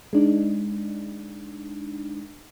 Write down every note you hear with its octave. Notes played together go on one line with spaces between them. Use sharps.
G#3 D4 D#4